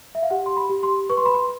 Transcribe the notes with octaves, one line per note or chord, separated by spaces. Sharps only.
E5
F5
G4 F#5
C6
B5
G4
C6
B4 C#6
C6
B5
C6